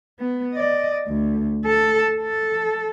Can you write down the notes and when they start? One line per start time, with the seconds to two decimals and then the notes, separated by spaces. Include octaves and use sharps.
0.19 B3
0.53 D5 D#5
1.07 D2
1.65 A4
2.21 A4